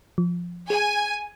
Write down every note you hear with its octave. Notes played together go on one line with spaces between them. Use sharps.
F3
G#4 G#5